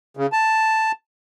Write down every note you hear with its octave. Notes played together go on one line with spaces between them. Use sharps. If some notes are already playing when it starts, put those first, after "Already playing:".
C#3
A5